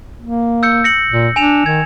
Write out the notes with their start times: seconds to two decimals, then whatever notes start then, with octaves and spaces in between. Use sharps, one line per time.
0.22 A#3
0.63 E6 G6 C#7
0.84 A#6 C#7 F#7
1.11 A#2
1.36 D4 G#5 E7 F7
1.66 D#3 G#6